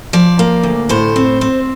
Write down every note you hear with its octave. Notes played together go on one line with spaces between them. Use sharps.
F3 D5
A#3
D2
A2 C5
C4
C4